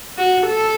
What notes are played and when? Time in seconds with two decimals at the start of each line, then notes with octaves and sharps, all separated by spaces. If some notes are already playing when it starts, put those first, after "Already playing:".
0.18 F#4
0.46 A4